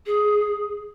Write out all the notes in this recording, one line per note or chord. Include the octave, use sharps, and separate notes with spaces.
G#4